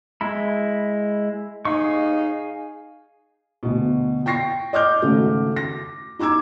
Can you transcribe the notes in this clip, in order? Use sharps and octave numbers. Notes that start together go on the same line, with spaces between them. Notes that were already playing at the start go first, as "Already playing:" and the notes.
G#3 E4 B5
D#4 G#4 F5 C#6
D2 B2
G5 C#6 A#6 C7
D#5 D6 F6 G6
G#1 C#3 A3 F#4
A#6
D#4 A#5 D6 E6 G#6